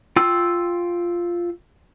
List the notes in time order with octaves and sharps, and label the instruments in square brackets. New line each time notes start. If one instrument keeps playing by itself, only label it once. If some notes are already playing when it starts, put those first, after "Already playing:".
[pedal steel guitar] F4 G5 E6